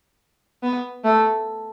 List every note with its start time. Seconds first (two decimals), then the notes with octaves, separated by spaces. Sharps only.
0.63 B3
1.04 A3